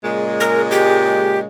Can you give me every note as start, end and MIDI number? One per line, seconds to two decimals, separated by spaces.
0.03 1.45 46
0.03 1.45 49
0.03 1.45 56
0.40 0.61 70
0.71 1.39 67